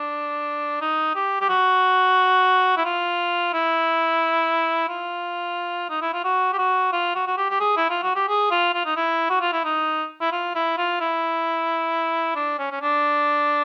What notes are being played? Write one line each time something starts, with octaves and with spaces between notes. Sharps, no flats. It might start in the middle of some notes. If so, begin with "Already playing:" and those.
Already playing: D4
D#4
G4
G4
F#4
E4
F4
E4
F4
D#4
E4
F4
F#4
G4
F#4
F4
F#4
F#4
G4
G4
G#4
E4
F4
F#4
G4
G#4
F4
F4
D#4
E4
F#4
F4
E4
D#4
E4
F4
E4
F4
E4
D4
C#4
C#4
D4